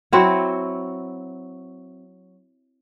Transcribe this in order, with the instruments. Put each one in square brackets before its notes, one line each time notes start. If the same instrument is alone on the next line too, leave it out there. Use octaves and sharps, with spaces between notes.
[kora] F#3 C4 E4 F#4